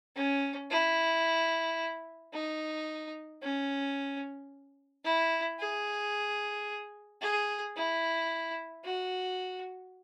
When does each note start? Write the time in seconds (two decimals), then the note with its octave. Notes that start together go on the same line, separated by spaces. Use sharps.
0.16 C#4
0.71 E4
2.33 D#4
3.42 C#4
5.04 E4
5.59 G#4
7.22 G#4
7.76 E4
8.84 F#4